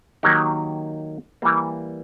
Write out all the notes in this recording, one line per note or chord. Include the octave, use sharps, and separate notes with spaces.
D#3 F#3 A#3 D#4 G4
E3 G3 A#3